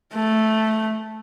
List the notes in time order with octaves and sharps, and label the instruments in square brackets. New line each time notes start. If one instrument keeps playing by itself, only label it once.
[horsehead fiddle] A3